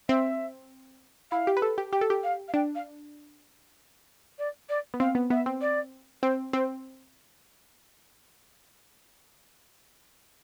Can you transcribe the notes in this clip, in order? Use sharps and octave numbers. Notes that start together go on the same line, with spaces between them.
C4 E5
E4 F5
G4
B4
A4
G4
G4 G5
A4
G4
F5
F5
D4 G5
F5
D5
D5
B3
C4 F5
B3
B3 E5
C4
D5
C4 C5
C4 C5